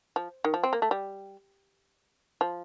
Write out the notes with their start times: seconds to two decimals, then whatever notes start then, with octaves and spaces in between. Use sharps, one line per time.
0.16 F3
0.45 D#3
0.54 F3
0.63 C4
0.73 A#3
0.82 A3
0.91 G3
2.41 F3